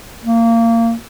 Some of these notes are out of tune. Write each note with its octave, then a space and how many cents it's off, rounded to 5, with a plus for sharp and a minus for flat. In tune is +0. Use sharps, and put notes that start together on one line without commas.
A#3 -25